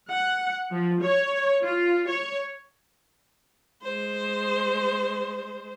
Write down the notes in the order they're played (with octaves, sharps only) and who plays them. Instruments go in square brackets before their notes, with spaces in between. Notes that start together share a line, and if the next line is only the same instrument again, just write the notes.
[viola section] F#5
F3
C#5
F4
C#5
[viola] G#3 C5